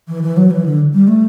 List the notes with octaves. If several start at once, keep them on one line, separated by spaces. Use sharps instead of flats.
E3
E3
F#3
E3
D3
G3
A3